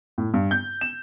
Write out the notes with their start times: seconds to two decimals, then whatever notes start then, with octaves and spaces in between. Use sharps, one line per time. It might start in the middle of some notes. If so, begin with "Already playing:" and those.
0.18 A2
0.34 G2
0.51 G6
0.81 E7